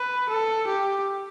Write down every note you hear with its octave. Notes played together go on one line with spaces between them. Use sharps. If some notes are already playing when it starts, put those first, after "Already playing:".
Already playing: B4
A4
G4